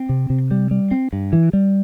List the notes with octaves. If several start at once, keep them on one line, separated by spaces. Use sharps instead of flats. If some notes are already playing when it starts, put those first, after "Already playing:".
Already playing: C4
C3
C3
G3
G3
C4
G2
E3
G3